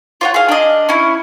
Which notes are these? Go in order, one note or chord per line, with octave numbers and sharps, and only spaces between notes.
F4 C#5 F#5
G#4 F5
D4 D#5
C#4 E4